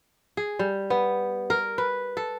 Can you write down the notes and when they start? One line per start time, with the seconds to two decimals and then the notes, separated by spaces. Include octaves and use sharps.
0.37 G#4
0.59 G3
0.90 B3
1.50 A#4
1.78 B4
2.17 A4